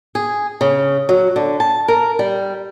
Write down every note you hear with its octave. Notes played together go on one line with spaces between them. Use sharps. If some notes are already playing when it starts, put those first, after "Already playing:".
G#4
C#3
F#3
D3
A5
A#4
G3